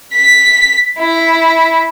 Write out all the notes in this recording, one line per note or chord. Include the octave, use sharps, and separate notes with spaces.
B6
E4